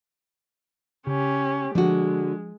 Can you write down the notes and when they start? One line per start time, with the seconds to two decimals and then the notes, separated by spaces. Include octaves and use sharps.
1.07 C#3 C#4 G4
1.75 D3 F3 G#3 F#4